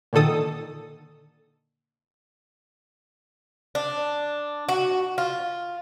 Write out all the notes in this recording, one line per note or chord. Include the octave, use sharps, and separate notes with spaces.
A#2 D3 D#3 A4 D#6
D4
F#4
F4